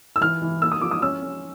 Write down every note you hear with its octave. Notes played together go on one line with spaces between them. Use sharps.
E6
E3 F6
E3
A#3 E6
D#6
F3 D6
D#6
C#4 E6
C#4